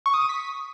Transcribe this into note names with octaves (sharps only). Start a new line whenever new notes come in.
C#6
D#6
D#7
B6